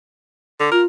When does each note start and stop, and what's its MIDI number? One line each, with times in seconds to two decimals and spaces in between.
0.60 0.69 50
0.72 0.85 65
0.72 0.82 70